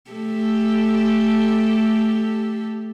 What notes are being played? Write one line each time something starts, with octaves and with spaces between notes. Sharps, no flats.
A3 G4 A4